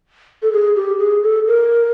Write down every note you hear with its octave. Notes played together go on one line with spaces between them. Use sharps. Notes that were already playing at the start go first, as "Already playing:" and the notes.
A4
G#4
G4
G#4
A4
A#4